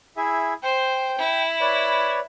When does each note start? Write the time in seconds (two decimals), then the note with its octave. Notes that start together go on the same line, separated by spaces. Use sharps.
0.17 E4 G#4 E5
0.63 C5 G5 G6
1.19 E4
1.61 B4 C#5 D5